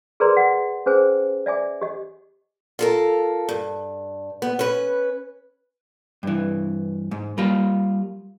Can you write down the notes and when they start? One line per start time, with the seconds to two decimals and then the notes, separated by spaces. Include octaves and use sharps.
0.20 G#4 A#4 B4 D5 A#5 C6
0.37 F#5
0.86 C#4 G#4 B4 C5 G#5
1.46 D5 E5 G#5 D6
1.81 G4 D#5
2.79 F4 A4 A#4
3.49 G2
4.42 B3
4.59 C#4 B4
6.23 G2 E3
7.11 G#2
7.38 G3 A#3 F4